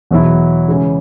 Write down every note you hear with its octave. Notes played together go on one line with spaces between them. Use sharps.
E2 B2 F#3 E4
C#3 E3 G#3 C#4